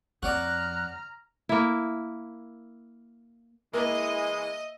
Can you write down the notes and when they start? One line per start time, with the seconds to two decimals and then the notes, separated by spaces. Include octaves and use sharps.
0.23 F2 F#4 C#5 D5 A#5 F6 F#6
1.49 A#3 E4
3.73 E3 G#3 A#3 D#5 E5